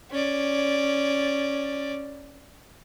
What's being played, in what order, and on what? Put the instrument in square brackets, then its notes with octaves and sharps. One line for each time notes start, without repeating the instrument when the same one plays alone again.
[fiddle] C#4 D5